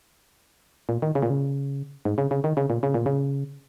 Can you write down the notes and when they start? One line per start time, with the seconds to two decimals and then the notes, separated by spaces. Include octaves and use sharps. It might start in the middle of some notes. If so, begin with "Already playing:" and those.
0.89 A#2
1.02 D#3
1.15 C#3
1.22 A#2
1.30 C#3
2.05 G#2
2.18 C#3
2.31 C#3
2.44 D#3
2.57 C#3
2.70 A#2
2.83 C#3
2.94 A#2
3.06 C#3